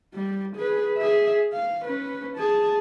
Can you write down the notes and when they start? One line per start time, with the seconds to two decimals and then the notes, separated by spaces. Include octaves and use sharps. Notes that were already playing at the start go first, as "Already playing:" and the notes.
0.14 G3
0.57 G#4 B4
0.98 G#4 E5
1.53 F5
1.85 C#4 B4
2.37 G#4 A5